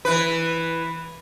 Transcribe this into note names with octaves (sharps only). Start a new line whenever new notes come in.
E3 B4